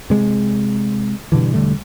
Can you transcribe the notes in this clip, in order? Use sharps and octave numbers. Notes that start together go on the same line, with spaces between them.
C3 G#3
G2 B2 D3 E3
E1 D3 G3 A3